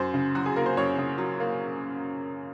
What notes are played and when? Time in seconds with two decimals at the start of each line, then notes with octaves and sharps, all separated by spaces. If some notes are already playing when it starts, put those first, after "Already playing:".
Already playing: F#2 C5
0.14 C#3
0.35 F#3 F#4
0.46 G#4
0.56 A#3 A#4
0.66 C5
0.77 F#2 C#5
0.98 C#3
1.18 F#3
1.40 A#3